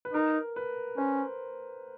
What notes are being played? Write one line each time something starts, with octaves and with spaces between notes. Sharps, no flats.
B4
D#4 A#4
B4
C#4 C5